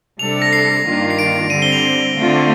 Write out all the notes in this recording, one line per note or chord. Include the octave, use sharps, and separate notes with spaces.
C3 G3 D4 A4 F7
A#6
C7
G2 D#3 A#3 D4 F4
C7
D7
D3 G3 C4 D#7
G7
F7
D3 A3 C4 F4